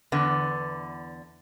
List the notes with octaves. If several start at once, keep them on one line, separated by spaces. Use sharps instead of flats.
E2 D3 B3